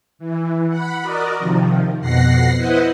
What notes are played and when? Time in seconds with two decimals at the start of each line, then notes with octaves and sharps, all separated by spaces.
0.19 E3
0.68 F#5 B5
1.01 F#4 A#4 D5 D#5
1.39 C3 D#3 F3
2.00 F2 B2 F#5 A#6 C7
2.56 E4 B4 C5 D#5 F#5